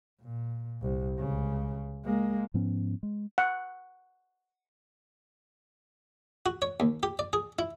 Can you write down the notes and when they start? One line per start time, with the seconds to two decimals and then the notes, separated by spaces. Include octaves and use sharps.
0.22 A#2
0.82 C2
1.19 C#2 C#3
2.05 G#3 A#3
2.54 G#2 F3 B3 C#4
3.03 G#3
3.38 F#5
6.46 F#4
6.62 C#5
6.80 D#2
7.03 G4
7.19 D5
7.33 G#4
7.59 E4